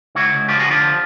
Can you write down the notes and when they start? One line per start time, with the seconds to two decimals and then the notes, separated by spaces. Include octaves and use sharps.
0.15 C#2 E4 F#4
0.32 C#2
0.49 F3 F4 G4
0.59 F#4 G#4
0.65 D3
0.71 F4 G4
0.81 F3